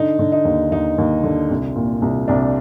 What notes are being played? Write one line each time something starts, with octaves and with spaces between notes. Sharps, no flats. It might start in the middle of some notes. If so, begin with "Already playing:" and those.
Already playing: D3 D#4
D3
D#4
D#2
D#2 D#4
D#2
D3
C2
A#2
C2
C2 D4